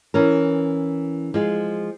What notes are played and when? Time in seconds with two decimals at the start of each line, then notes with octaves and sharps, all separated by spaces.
0.14 E3 C#4 A#4
1.34 F3 G#3